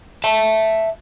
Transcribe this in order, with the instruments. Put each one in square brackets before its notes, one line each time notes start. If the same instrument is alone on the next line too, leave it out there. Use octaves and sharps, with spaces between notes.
[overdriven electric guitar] E5 A5